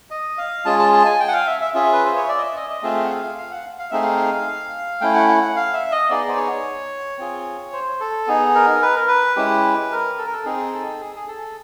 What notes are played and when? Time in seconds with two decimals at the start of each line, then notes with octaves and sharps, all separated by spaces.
0.11 D#5
0.38 F5
0.65 G#3 C#4 F4 G#4 A5
0.79 A5
0.93 A5
1.05 G#5
1.20 G5
1.28 F#5
1.33 F5
1.47 E5
1.61 E5
1.74 C#4 F4 G#4 E5
1.93 B4
2.05 C5
2.16 C#5
2.29 D5
2.38 D#5
2.42 E5
2.56 D#5
2.70 D#5
2.82 A3 C4 F4 G#4 E5
3.04 F#5
3.10 F5
3.38 F5
3.51 F#5
3.79 F5
3.91 A3 C4 D#4 G#4 E5
4.02 F5
5.01 A3 C#4 E4 G5
5.15 F#5
5.28 F#5
5.41 F#5
5.56 F5
5.74 E5
5.92 D#5
6.09 B3 D#4 G#4 D5
6.29 C5
6.37 C#5
7.18 C4 F4 G#4
7.73 C5
8.00 A4
8.27 B3 D#4 G#4
8.55 A#4
8.82 B4
8.96 A#4
9.08 B4
9.36 G#3 C#4 E4 G4
9.92 A#4
10.18 A4
10.26 A#4
10.33 A4
10.45 C4 D#4 G#4
10.73 A4
11.01 G#4
11.16 G#4
11.28 A4